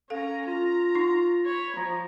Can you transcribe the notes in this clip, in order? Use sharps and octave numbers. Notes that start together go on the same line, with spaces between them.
C#4 A4 F5 A#5
F4 A#5
D#4 C#6
C#5 B5
F3 A#5